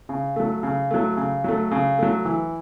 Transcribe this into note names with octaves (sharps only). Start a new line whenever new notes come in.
C#3
F#3 A3
C#3
F#3 A3
C#3
F#3 A3
C#3
F#3 A3
E3